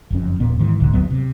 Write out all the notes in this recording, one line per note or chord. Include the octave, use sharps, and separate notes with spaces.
F#1 F2 C#4
D#1 A#2 B3
G#2 D#3 E3
F1 C2 G#2 D3
F#1 D2 F#3 B3
C3